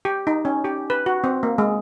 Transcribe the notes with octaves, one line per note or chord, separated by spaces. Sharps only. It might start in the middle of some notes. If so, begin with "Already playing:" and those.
G4
D#4
C#4
G4
B4
F#4
C4
A#3
G#3